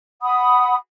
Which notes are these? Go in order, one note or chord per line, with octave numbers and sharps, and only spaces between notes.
F#5 B5 D#6